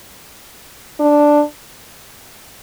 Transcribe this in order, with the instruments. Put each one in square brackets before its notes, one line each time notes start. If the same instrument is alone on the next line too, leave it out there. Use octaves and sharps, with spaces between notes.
[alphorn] D4